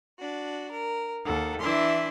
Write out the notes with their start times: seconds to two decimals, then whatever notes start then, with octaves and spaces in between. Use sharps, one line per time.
0.18 D4 F#4
0.71 A#4
1.24 D#2 A4 F#5
1.60 E3 D4 E4 E5 C6